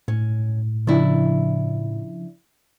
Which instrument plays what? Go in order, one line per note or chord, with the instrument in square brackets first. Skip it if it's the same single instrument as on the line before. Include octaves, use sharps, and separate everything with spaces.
[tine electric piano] A2 [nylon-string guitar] C#4
[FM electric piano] C#3 F3 [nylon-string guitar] D4 E4